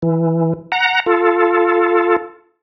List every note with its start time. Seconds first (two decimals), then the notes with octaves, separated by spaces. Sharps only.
0.02 E3
0.72 F#5 A#5
1.06 F4 A4